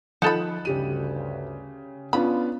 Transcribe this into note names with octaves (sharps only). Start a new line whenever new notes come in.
F3 D#4 A4 B5 F#6 E7
D2 G2 C#3 G4 D#7
B3 C#4 D4 F4 B5